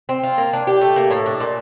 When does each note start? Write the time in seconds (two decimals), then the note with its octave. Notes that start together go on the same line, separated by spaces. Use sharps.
0.09 C4
0.23 F4
0.38 A#3
0.53 D4
0.67 G4
0.81 A3
0.96 A#3
1.10 A2
1.26 D4
1.40 A#2